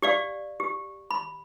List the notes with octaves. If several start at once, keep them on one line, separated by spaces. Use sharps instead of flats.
G4 D5 F5
G4
B5